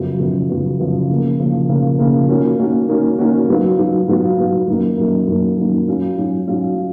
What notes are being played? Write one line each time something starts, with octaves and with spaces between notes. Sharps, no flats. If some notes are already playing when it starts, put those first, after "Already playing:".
Already playing: F#2 C#3 F3 B3 F#4
F#2 C#3 F3 B3 F#4
F#2 C#3 F3 B3 F#4
F#2 C#3 F3 B3 F#4
C#3 F3 A#3
C#3 F3 A#3
C#3 F3 A#3
C#3 F3 A#3
D#3 A#3 C#4 F#4
D#3 A#3 C#4 F#4
D#3 A#3 C#4 F#4
D#3 A#3 C#4 F#4
G#2 F#3 B3 F4
G#2 F#3 B3 F4
G#2 F#3 B3 F4
G#2 F#3 B3 F4
F#2 D#3 A#3
F#2 D#3 A#3
F#2 D#3 A#3
F#2 D#3 A#3
G#2 F#3 C#4 F4
G#2 F#3 C#4 F4
G#2 F#3 C#4 F4
F4